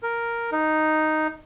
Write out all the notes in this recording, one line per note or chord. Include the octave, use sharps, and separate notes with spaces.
A#4
D#4